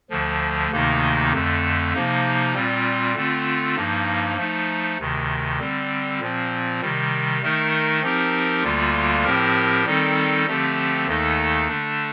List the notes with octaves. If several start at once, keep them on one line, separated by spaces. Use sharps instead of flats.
D2 D3 F3
D2 C3 D#3 A#3 D#4
F2 D3 A3
C3 F3 A#3 D#4
A#2 G3 C4 F4
D3 A3 C4 F4
G2 F3 A#3 D#4
F3 A3 D#4
D2 C3 D#3
D3 G3 C4
A#2 F3 C4
C3 D#3 G3
D#3 A3 D#4 A#4
F3 C4 D#4 G4 A#4
D2 D3 G3 A#3 F4
A2 F3 C4 G4 A#4
D#3 G3 C4 D#4 A4
D3 F3 A3 C4 G4
D#2 D#3 A3 D#4 A4
D3 A3 D4